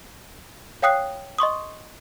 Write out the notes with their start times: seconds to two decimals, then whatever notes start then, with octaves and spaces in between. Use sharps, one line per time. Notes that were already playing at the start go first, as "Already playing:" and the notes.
0.82 C#5 F5 G5 D#6 F#6 C7
1.38 D#5 C6 C#6 D#6